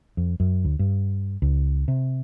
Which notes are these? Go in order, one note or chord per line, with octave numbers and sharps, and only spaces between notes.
F2
F#2
D2
G2
C#2
C3